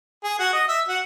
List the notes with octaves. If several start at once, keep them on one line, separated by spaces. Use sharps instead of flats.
G#4
F#4
D#5
E5
F#4